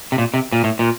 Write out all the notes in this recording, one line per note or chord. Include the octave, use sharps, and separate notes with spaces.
C3
A#2
C3
A#2
A2
A#2